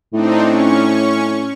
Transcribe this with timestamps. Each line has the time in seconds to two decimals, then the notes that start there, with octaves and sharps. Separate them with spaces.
0.13 A2 C4 D4 D#4
0.46 C#4 C#6